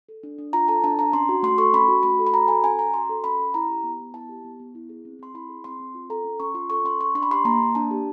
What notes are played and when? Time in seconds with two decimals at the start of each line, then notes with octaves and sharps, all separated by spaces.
0.09 A4
0.23 D4
0.38 D4
0.53 F4 A#5
0.68 A4 A5
0.84 D4 A5
0.98 D4 A#5
1.13 C#4 C6
1.29 F#4
1.43 A3 C6
1.58 A4 C#6
1.74 C#4 B5
1.88 F#4
2.03 A3 B5
2.19 A4
2.27 B5
2.33 F#4 A#5
2.48 A4 G#5
2.63 C#4 G#5
2.79 C#4 A#5
2.94 F#4 C6
3.09 A4
3.24 C#4 B5
3.40 C#4
3.54 E4 A#5
3.69 G4
3.84 B3
4.00 B3
4.14 E4 A5
4.29 G4
4.44 B3
4.60 B3
4.75 E4
4.89 G#4
5.05 C4
5.19 C4 C6
5.34 E4 B5
5.49 G#4
5.64 C4 C6
5.80 C4
5.95 F4
6.10 A4 A#5
6.25 C#4
6.40 C#4 C#6
6.54 F4 C6
6.70 A4 C#6
6.84 C#4 C6
7.01 C#4 C#6
7.15 D4 C6
7.23 B5
7.31 G4 C6
7.45 A#3 A#5
7.60 A#3
7.75 D4 A5
7.91 G4